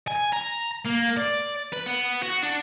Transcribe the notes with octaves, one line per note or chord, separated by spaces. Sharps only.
G#5
A#5
A#3
D5
B4
B3
F#4
D4